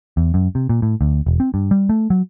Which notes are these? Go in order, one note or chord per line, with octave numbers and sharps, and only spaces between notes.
E2
F#2
C3
A#2
A2
D2
E1
C4
G2
G3
A3
F#3